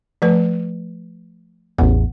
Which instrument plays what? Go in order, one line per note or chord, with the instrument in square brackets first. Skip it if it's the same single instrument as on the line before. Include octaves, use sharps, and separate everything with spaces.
[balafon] F3 A3 B4
[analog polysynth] A1 E2 [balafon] F#5